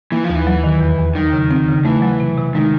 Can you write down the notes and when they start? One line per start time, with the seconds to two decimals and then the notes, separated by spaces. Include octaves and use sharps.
0.12 E3 A#3
0.24 F3
0.30 D#2
0.35 E3
0.47 F#3
0.64 D#3
0.81 E2
0.99 E2
1.15 D#3 F#3
1.33 C#3
1.51 C4
1.68 C#3
1.85 E3 A3
2.02 F#3
2.20 C3
2.38 C3
2.55 D#3 G#3